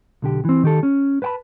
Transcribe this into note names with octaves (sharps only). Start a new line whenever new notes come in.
B1 D3 G4
E3 C4
D#3 G4 A4
C#4
B4 C5 G5 A5 B5